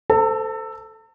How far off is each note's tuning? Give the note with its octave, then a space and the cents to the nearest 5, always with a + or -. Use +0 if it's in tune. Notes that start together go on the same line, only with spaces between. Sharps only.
A4 +0 C5 -30 A5 +45